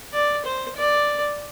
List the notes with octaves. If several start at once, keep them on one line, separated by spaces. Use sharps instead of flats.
D5
C5
D5